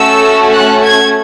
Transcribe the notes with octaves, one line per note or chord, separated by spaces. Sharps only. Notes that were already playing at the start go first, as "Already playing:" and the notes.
Already playing: A3 C#4 F#4 A4 E6
F#6
G#6